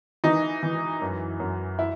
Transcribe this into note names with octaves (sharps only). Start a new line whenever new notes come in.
E3 D#4
E3
F#2
F#2
E4